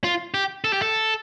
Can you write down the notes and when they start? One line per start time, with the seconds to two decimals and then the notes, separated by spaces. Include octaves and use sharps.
0.04 F4
0.34 G4
0.64 A4
0.73 G4
0.82 A4